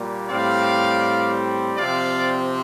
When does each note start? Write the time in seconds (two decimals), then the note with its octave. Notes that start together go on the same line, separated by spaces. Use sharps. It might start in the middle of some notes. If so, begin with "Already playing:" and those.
Already playing: A#2 G3 A#3
0.29 A2 G3 C4 D5 F5
1.77 C3 F3 C4 D5 F5